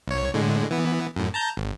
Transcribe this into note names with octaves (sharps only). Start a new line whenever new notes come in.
C2 C#5
A2 D3 G#3
E3 B3
F#2 A2
A5 A#5 G6
G#1